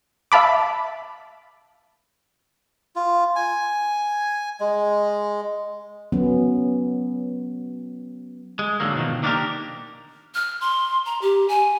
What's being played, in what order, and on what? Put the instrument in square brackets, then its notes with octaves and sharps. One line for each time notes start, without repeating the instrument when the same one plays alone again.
[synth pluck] E5 F5 A5 B5 D6
[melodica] F4
G#5
G#3
[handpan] F#3 B3 C#4
[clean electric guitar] G#3
G#2 D3 F#3 A3 A#3
B2 D#3 F3
D#3 A#3 D4 D#4 G4 A#4
[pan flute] F6
C6
A#5
G4
G#5